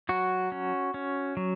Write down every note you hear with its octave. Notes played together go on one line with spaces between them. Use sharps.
F#3 F#4
C#4
C#4
F#3